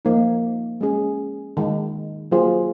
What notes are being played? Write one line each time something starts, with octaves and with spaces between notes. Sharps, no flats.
F3 A#3 D#4
G#3 C#4 G#4
D#3 G#3 D#4
F#3 A#3 F4 G#4 C5